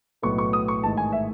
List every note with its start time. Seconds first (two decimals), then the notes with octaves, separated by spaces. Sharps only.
0.22 B1 A2 F#3 B3 C#6
0.38 C#6
0.53 D#6
0.68 C#6
0.84 A1 G#2 D#3 A5
0.97 G#5
1.12 E5